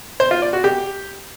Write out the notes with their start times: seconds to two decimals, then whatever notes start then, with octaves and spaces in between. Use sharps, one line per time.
0.20 C5
0.31 F4
0.42 D5
0.53 F#4
0.64 G4